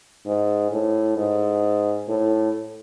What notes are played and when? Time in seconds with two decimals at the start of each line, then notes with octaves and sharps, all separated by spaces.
0.26 G#2
0.71 A2
1.17 G#2
2.08 A2